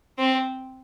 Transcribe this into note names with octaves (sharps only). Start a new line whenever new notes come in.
C4